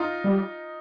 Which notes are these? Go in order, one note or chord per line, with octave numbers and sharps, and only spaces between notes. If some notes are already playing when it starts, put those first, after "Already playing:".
Already playing: D#4 F4
G3